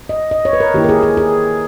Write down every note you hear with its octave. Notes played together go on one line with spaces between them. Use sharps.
D#5
D#5
C#5
B4
A#4
D#3 A#3 E4 G4
A#4
G#4
G#4
G#4